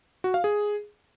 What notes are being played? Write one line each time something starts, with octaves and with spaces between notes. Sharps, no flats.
F#4
F5
G#4